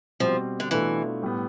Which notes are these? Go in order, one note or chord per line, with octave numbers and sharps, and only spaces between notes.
B2 F3 G3 C4
D3
B2 E3 A3 D4 F4
A2 G3 B3